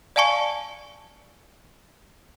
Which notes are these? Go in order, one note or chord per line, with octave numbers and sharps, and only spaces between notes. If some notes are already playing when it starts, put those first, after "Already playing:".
D5 F5 G#5 A5 C#6 C#7